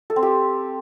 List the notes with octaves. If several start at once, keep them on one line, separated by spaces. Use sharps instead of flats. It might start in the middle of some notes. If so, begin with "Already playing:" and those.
A4
C4
G4